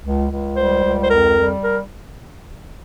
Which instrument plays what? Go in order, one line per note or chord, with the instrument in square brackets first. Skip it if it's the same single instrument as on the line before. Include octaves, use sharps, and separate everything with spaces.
[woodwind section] C#2
C#2
G3 C5
C#2
C5
F2 A#4
G3
A#4